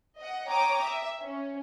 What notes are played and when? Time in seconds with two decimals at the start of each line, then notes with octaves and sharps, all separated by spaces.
0.18 D#5 F#5
0.49 C#5 G5 A#5 D6 D#6
0.84 E5
1.21 C#4